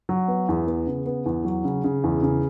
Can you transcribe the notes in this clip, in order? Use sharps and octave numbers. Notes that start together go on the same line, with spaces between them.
F#3
B3
E2
B3
C#3
B3
E2
F#3
C#3
C#3
E2
C#3